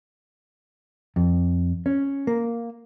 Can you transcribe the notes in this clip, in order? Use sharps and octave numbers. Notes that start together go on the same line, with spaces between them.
F2
C#4
A#3